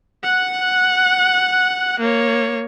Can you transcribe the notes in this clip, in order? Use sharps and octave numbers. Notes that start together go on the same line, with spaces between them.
F#5 F#6
A#3 C#5